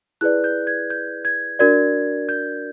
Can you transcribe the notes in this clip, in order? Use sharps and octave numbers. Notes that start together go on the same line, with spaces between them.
E4 G#4 B4 D5 F#6
G6
G#6
G6
G#6
D4 F#4 A#4 D5 G#6
G6